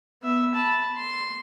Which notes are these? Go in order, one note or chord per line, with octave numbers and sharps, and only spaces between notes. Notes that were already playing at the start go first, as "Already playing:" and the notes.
B3 E5
A5 B5
C6